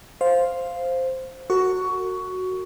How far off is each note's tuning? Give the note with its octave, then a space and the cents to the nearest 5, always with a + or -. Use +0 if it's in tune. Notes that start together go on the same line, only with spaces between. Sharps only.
C5 +0 F5 +0
F#4 +0 A#4 -40 C#6 +15